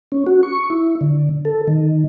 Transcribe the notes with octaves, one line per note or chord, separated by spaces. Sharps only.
C#4
F#4
C#6
E4
D3
A4
D#3